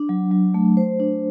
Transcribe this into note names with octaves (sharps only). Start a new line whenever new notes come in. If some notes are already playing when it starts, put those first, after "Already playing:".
Already playing: D4
F#3
F#3
A3
C5
D4